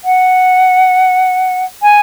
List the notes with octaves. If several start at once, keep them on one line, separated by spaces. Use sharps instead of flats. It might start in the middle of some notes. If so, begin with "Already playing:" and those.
F#5
G#5